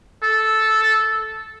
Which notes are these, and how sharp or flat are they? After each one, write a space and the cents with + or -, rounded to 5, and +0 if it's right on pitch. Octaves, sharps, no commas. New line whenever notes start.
A4 -5